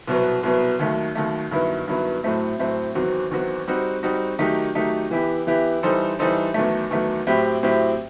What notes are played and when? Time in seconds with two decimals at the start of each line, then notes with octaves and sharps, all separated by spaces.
0.07 C2 B2 F#3 B3
0.43 C2 B2 F#3 B3
0.79 D#2 D#3 F#3 A3
1.15 D#2 D#3 F#3 A3
1.51 G2 D#3 F#3 B3 E4
1.88 G2 D#3 F#3 B3 E4
2.23 A2 F#3 A3 C4
2.59 A2 F#3 A3 C4
2.95 E2 D#3 F#3 C4 F#4
3.31 E2 D#3 F#3 C4 F#4
3.67 G3 C4 D#4 F#4
4.03 G3 C4 D#4 F#4
4.39 D#3 F#3 A3 D#4 G4
4.75 D#3 F#3 A3 D#4 G4
5.11 E3 B3 E4 G4
5.47 E3 B3 E4 G4
5.83 E3 G3 D#4 A4 C5
6.19 E3 G3 D#4 A4 C5
6.54 E2 D#3 F#3 A3
6.91 E2 D#3 F#3 A3
7.27 A2 F#3 C4 E4 G4
7.63 A2 F#3 C4 E4 G4